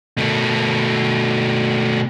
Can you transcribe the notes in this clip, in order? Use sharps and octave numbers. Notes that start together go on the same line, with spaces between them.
B2 A3